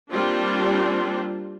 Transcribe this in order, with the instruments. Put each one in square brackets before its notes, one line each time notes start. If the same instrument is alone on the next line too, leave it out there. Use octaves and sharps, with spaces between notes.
[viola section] G3 A#3 C4 D4 F4